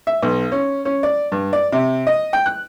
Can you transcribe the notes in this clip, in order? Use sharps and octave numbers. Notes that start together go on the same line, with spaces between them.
E5
B1
C#4
C#4
D5
G2
D5
C3
D#5
G5
F#6